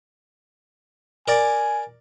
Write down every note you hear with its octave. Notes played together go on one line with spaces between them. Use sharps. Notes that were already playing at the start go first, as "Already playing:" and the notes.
A#4 D5 G#5